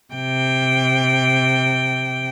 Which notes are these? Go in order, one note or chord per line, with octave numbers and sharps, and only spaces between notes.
C3 G5